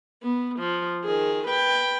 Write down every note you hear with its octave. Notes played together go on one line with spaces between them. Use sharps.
B3
F3
D#3 G#4
B4 G5